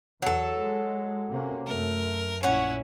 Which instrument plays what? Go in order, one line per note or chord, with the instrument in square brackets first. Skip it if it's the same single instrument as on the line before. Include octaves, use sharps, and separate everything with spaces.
[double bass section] E2 [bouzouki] F#3 A4
[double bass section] G#3
C3 A#3 C#4
[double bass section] F#2 A3 [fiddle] A#4
[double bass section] A#1 A#2 [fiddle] C#4 E4 [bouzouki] C#5 F#5